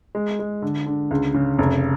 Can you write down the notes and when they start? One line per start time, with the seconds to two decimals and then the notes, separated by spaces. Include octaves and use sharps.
0.15 G#3
0.39 G#3
0.62 D3
0.86 D3
1.11 C#2
1.34 C#3
1.58 F1